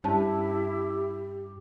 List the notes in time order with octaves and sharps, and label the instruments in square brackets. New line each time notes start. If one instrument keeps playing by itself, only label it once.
[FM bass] G2 [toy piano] C#4 C5 A5 [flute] E4 [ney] G4